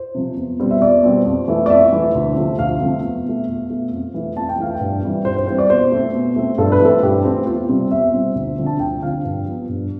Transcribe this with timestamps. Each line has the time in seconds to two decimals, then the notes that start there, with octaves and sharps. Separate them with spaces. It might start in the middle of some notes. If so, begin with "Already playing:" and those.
Already playing: C5
0.15 C3 F3
0.37 E2
0.60 B2 G3 C4
0.71 E5
0.82 E2 D5
1.03 B2 G3 C4
1.26 F2
1.48 E3 A3
1.66 D5
1.70 F2 E5
1.93 E3 A3
2.15 D2
2.36 C3 F3 A3 C4
2.59 D2 F5
2.81 C3 F3 A3 C4
3.03 E2
3.25 B2 A3
3.48 E2
3.70 B2 A3
3.92 F2
4.14 E3 A3
4.37 F2 A5
4.49 G5
4.59 E3 A3 F5
4.74 G5
4.81 G2
5.03 E3 G3 C4
5.25 G2 C5
5.36 C5
5.47 E3 G3 C4 C5
5.58 D5
5.70 B2 C5
5.92 A3 C4
6.14 B2
6.36 A3 C4
6.58 G2 A4
6.72 B4
6.80 E3 A3 C4 A4
7.03 G2 G4
7.25 E3 A3 C4
7.46 E2 F4
7.69 C3 G3 C4
7.91 E2 E5
8.13 C3 G3 C4
8.35 D2
8.58 D3 F3 C4
8.66 A5
8.80 D2 G5
9.02 D3 F3 C4 F5
9.25 G2
9.46 F3 B3
9.69 G2